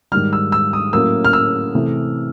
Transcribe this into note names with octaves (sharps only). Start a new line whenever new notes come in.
G#2 D#3 G3 F6
E6
E6
D#6
A2 F#3 A#3 C#4 E6
F6
E6
C3 E3 A3